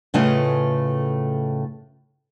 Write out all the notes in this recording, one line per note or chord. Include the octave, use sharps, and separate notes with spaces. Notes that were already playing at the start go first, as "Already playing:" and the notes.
A2 C#3 A3 F4 B4 D#5